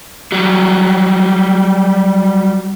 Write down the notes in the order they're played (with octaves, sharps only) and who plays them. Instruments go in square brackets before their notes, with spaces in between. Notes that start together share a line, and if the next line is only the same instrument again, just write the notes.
[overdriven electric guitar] F#3 G3